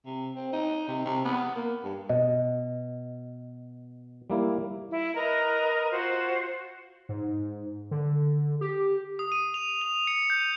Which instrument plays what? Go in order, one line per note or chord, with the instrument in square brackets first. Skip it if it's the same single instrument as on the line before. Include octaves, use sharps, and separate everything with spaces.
[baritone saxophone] C3
C4
D#4
C3
C3
B3
A#3
G2
[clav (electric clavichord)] B2 [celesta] D#5
[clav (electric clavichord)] G3 A#3 E4
[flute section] E4
A#4 B4 D#5 A#5
F4 F#4 C5
[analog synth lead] G#2
D3
G4
[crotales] D#6
D#7
F7
F7
C#7
G6